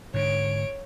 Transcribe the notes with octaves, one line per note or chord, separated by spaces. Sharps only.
G#2 D3 C#5 D7